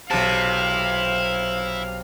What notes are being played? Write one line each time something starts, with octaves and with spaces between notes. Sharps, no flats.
B1 C3 E4 F5 A5